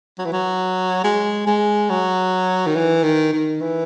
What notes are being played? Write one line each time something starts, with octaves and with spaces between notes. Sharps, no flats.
F#3
E3
F#3
G#3
G#3
F#3
D#3
E3
D#3
D#3
E3